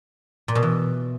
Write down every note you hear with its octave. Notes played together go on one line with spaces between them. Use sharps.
A#2
B2
E3